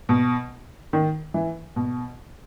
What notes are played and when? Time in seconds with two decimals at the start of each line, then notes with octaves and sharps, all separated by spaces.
0.09 B2
0.93 D#3
1.34 E3
1.76 B2